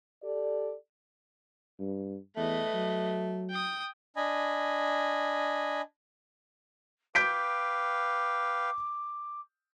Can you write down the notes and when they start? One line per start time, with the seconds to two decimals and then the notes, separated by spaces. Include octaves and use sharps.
0.22 G4 A4 D5
1.80 G2
2.37 E2 A3 B4 D#5
2.74 F#3
3.50 G5 D#6
4.16 D4 D#5 G#5 B5
7.15 B4 F5 G5 D6 G6 B6 D7